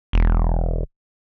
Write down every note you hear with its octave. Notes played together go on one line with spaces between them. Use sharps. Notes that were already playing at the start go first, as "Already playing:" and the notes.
E1